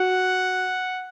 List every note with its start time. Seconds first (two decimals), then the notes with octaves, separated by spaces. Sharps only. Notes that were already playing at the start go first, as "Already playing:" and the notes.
Already playing: F#4 F#5